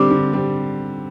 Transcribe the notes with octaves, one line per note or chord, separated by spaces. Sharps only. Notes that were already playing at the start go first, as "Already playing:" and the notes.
Already playing: D3 G3 C4 D5
D3
G3 C4